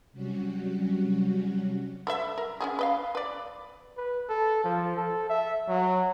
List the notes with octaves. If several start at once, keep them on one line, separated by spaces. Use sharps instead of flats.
C3 F#3 G3 C#4 F#4
A4 B4 E5
A#4
C#4 F4 G#4
B4 D#5 F5
B4 D5
B4
A4
F3
A4
E5
F#3